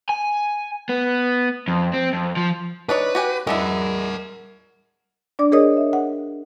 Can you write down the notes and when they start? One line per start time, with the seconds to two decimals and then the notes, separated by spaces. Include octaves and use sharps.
0.09 G#5
0.89 B3
1.68 F2
1.94 C4
2.13 F2
2.37 F3
2.89 D4 D#4 B4 C#5
3.15 F#4 G4 G#5
3.47 G#3 D4 E4 A#4 F#5
5.39 D4 D5 D6
5.52 G#4 A#4 C#5 D#5 D#6
5.77 E5
5.93 F#5